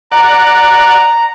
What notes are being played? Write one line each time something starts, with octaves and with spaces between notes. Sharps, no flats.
D5 F#5 A#5